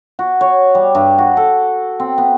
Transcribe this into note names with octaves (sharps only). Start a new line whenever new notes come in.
F#4
C#5
G3
G2
F#4
A4
C4
B3